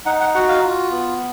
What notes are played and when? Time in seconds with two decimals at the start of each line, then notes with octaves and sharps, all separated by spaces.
0.06 D#4 F#5
0.20 F#5
0.34 F#4 F#5
0.49 F5
0.63 F4
0.91 B3